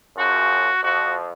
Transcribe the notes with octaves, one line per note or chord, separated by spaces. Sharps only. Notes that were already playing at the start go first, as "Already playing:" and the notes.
F#2 C#3 F3 F#4
F2 F3 F#4